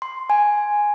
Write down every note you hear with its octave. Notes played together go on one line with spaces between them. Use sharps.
C6
G#5